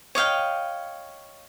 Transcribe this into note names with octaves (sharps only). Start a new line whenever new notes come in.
C#5 D#5 F5 G5